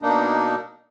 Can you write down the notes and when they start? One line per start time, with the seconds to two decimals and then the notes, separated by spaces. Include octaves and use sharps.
0.02 B2 A#3 D4 D#4